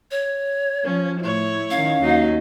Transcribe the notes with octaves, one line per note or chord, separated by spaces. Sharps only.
C#5
F3 C#4
A2 E4 C#5
D#3 C#4 F5
D#2 F#3 D#4